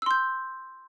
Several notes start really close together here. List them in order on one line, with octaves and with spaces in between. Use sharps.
E6 C6 G6